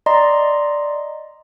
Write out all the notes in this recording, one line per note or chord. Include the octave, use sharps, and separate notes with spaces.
D5 D#5 A#5 C6